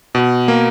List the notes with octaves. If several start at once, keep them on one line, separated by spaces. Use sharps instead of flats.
B2
A#3